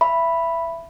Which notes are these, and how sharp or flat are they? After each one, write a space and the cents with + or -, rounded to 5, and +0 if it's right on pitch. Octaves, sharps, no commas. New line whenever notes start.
E5 +20 B5 +0